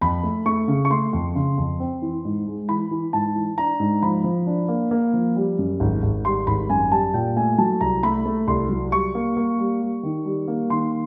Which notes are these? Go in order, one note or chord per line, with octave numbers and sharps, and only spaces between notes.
F2 B5
A3
A3 C#6
C#3
C#6
A3 C6
F2
C#3
F2
C4
E3
G#2
G#3
E3 B5
E3
G#2 A5
E3
D4 A#5
G#2
F3 B5
F3
D4
A#3
A#3
F3
G3
F#2
G#1
G#1
G3 C6
G#1 B5
F#2 G#5
G3 A5
A#2 G5
A3 G#5
F#3 A5
C2 A#5
A3 B5
A3
C2 C6
F#3
G3 C#6
A#3
A#3
G3
G3
D#3
G3
A#3
D#3 C6